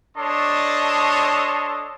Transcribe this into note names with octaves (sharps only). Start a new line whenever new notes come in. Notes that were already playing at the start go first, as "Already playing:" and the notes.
D4 A4 C#5 D#5 A5 C6